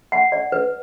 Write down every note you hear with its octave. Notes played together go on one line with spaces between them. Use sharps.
F#5
D5
B4